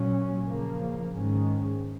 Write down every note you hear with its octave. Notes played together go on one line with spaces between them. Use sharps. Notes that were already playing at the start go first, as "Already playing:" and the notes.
Already playing: A#2 F#3 C#4
C#3 F3 A#3
G#2 D#3 G#3 C#4